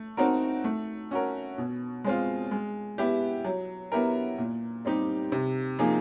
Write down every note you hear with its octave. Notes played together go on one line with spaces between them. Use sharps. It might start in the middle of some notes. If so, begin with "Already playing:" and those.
Already playing: A3
C4 D#4 F#4 A#4
A3
C#4 F#4 A#4
B2
G#3 C4 F4
G#3
B3 E4 G4
F#3
B3 E4 G4 A#4
A#2
G3 C4 D#4 G4
C3
F3 A#3 D#4 G#4